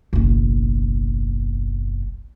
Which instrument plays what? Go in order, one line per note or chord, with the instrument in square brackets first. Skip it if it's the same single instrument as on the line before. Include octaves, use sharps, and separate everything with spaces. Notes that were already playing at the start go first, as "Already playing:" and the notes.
[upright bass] F#1 B1